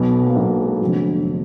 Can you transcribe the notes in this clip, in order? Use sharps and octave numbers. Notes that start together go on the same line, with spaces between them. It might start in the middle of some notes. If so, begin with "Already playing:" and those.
Already playing: B1 B2 B3
A#3
B1 B2 B3
A#3
G#3
F1 F2 D3 F#3
D3